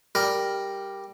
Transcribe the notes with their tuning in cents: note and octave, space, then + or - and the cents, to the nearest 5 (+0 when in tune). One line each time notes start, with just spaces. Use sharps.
G3 +0 A#4 +0